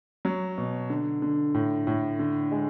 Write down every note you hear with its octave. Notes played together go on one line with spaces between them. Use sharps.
F#3
B2
D3
D3
A2
A2
D3
G#3